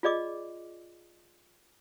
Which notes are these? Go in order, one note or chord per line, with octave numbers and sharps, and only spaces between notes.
F4 G#4 D5 D#5 D6